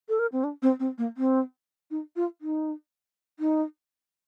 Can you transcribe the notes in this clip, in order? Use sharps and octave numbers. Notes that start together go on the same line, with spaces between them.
A4
A#4
C4
D4
C4
C4
A#3
C4
D#4
F4
D#4
D#4